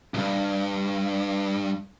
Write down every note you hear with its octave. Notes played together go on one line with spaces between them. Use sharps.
C2 G2